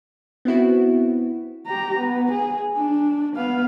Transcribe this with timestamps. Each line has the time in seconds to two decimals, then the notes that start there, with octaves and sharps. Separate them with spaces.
0.45 B3 C4 E4 F#4
1.66 G4 A#5
1.97 B3
2.31 G#4
2.77 D4
3.36 B3 F5